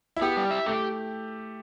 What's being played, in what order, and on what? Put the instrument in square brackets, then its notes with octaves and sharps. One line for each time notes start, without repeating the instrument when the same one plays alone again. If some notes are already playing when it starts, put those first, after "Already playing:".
[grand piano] E4
[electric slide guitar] B3 [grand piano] G4
[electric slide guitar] G3
E5
[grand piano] A3 [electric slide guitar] G4